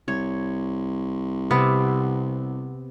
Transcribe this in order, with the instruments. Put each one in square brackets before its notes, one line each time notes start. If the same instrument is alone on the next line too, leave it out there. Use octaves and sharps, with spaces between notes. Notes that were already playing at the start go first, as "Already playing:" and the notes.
[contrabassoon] C2 [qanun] C#5
[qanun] C3 [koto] B3